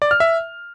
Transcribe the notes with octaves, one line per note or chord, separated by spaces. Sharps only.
D5
F6
E5